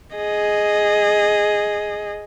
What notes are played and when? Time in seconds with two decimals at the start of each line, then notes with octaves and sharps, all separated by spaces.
0.17 G#4 D#5